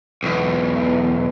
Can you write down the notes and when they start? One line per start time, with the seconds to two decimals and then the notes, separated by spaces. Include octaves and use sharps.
0.23 B1 E2